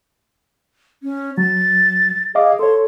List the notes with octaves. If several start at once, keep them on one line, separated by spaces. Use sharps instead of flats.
C#4
F#3 A6
G#4 D#5 F5 D6
A4 C#5 C6